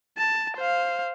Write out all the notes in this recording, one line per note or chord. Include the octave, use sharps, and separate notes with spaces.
A5
C5 F5